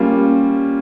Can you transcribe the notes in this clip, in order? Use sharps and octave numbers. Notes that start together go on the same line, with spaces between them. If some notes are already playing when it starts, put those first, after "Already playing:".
Already playing: G3 A#3 C#4 F4